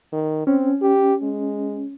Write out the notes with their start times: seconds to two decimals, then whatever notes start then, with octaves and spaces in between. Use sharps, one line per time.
0.12 D#3
0.47 C4 C#4
0.82 G4
1.22 G#3